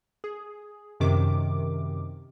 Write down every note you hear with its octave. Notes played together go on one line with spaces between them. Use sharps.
G#4
F#2 C3 D#3 D6